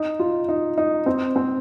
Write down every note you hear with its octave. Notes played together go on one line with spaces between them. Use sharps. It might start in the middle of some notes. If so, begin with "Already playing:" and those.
Already playing: D#4
F4
D#4
D#4
C4
C4